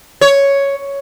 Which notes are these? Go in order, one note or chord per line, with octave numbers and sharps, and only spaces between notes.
C#5